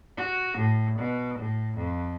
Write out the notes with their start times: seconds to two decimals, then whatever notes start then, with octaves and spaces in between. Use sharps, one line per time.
0.17 F#4
0.59 A2
0.98 B2
1.39 A2
1.77 F2